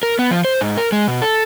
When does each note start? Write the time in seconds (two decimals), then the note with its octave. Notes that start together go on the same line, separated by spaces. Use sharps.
0.03 A#4
0.19 B3
0.31 F3
0.45 C5
0.61 G#2
0.77 A#4
0.92 G#3
1.08 B2
1.22 A4